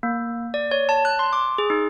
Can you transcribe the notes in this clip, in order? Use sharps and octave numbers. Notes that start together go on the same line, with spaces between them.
A#3
D5
C#5
A5
F#6
C6
D6
G#4
D#4